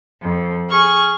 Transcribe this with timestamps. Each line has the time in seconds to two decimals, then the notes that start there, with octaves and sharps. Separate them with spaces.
0.21 F2
0.71 G#4 C#6 F6